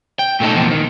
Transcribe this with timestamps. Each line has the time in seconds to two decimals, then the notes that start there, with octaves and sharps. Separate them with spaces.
0.19 G5
0.40 A#2 A3 D#4 A4
0.54 E2 A#2 F3
0.71 D#3